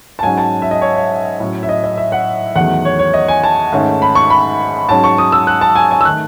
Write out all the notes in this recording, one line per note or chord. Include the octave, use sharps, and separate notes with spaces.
A5
G#2 F#3 C#4 G#5
A5
E5
D#5
C#5
C#5
A2 F#3 C#4
E5
D#5
D#5
E5
F#5
E2 D#3 F#3 A3 F#5
C#5
C#5
D#5
G#5
A5
G#2 D#3 A3 C#4
B5
C#6
B5
G#2 F#3 C#4 A5
C#6
D#6
E6
F#6
A5
G#5
G#5
E6
D#3 A3 F#6